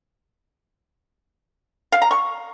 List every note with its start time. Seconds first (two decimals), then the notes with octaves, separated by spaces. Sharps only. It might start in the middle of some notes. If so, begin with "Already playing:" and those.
1.92 F5
2.02 A#5
2.11 C#6